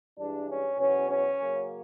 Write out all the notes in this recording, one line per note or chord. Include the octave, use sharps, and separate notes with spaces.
G2 E3 G#3 D4
C#4
E2 B2 F#3 C#4
C#4
C#3 F#3 A#3